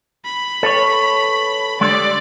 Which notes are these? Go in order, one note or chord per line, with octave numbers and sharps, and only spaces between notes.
B5
A4 B4 C#5
D3 G3 G#3 D5